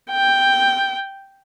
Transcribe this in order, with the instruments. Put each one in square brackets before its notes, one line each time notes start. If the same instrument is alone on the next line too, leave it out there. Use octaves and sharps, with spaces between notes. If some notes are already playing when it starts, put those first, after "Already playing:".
[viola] G5